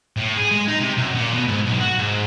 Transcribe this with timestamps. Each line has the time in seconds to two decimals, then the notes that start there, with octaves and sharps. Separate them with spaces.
0.17 A2
0.37 G#4
0.51 G#3
0.68 D#4
0.80 C3
0.97 F#2
1.15 A#2
1.34 B2
1.48 G#2
1.66 B1
1.80 F#4
1.99 G#2